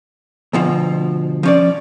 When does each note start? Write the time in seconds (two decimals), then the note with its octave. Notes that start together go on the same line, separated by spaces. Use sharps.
0.53 D2 B2 F3
1.43 F3 C#4 D5